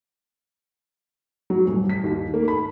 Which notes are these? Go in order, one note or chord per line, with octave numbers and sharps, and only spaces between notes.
F#3
D#1
B6
D#2
A#3
B5